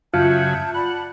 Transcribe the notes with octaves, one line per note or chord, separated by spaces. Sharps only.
F#2 C#3 F#3 F4 E5 A5 G6
D5 F#5 A5 B5